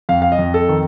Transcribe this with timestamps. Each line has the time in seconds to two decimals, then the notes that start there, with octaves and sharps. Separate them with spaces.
0.09 F2 F5
0.22 F5
0.32 D#5
0.39 F2
0.54 A4
0.69 D#3